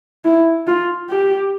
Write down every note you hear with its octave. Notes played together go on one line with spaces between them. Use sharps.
E4
F4
G4